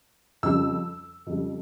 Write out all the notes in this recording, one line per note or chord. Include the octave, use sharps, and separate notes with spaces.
F2 C#3 G3 E6
F2 C#3 G3